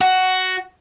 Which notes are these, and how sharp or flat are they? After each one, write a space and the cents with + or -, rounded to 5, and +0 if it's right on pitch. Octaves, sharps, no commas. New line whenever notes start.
F#4 +10